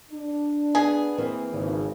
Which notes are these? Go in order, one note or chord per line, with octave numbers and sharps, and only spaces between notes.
D4
B3 G#4
E3 A#3 C4
G#1 C#3